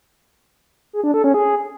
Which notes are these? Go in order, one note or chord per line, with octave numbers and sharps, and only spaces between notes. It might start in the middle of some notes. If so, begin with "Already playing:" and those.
G#4
D4
A4
C#4
G#4